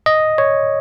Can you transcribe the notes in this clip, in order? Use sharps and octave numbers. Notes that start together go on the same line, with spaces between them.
D#5
C#5